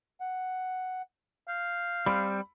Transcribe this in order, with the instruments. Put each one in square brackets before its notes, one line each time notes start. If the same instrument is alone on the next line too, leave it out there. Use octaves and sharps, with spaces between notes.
[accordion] F#5
[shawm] F5 [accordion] G6
[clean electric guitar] G3 C4 [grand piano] B5